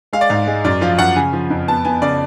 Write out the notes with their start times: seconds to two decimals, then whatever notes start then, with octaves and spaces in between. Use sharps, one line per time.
0.13 G#3 F5
0.21 D5
0.30 G#2 F5
0.47 G#3
0.64 F#2 D5
0.81 F3 F5
0.99 F#2 F#5
1.16 C#3 G#5
1.33 F3
1.50 F2
1.68 B3 A5
1.85 B3 G#5
2.02 C#3 D5